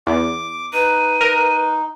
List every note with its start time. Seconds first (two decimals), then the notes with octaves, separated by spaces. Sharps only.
0.07 E2 D6
0.73 D#4 B4 D#7
1.21 A#4